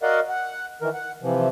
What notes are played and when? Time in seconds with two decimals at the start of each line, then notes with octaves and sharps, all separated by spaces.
0.03 F#4 A#4 D5 D#5 F5 F#5
0.29 F#5
0.82 D#3 E3 A#4
0.94 F#5
1.22 C3 E3 F3